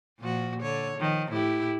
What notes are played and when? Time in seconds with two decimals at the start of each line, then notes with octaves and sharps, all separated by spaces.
0.19 A#2 F3 F#4
0.60 D3 C#5
0.98 D#3 F3
1.32 A2 E4 G4